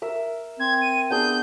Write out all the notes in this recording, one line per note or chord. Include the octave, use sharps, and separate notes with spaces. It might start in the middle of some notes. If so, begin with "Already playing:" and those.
A#4 E5
C4 G#6
D#7
B3 D4 G#4 G6